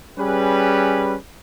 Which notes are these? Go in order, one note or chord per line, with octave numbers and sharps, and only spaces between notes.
G3 C#4 G#4 B4